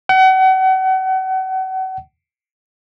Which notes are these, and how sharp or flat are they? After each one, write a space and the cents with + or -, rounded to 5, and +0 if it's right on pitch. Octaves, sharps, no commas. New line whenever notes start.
F#5 +35